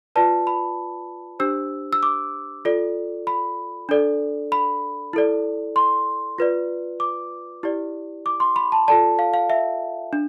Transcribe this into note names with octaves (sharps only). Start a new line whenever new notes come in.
F4 B4 D5 A5
B5
D4 G4 C5 E6
E6
D6
F4 A4 D5
B5
D4 A4 D5
B5
E4 A4 D5
C6
F4 B4 D5
D6
E4 G4 D5
D6
C6
B5
A5
F4 A4 D5 A5
F5
F5
E5
D4